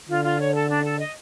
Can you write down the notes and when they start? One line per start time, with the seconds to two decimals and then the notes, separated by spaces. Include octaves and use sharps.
0.08 D3 F4
0.24 F4
0.39 C#5
0.54 A4
0.68 D4
0.84 A4
0.99 D#5